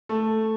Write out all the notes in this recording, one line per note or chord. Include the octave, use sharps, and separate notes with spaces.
A3 A4